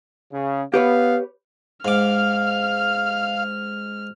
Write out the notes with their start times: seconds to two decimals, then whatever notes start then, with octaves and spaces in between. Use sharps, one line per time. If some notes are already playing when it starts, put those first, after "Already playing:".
0.32 C#3
0.74 B3 G4 B4 C#5 F5
1.85 G#2 F5 D6 F6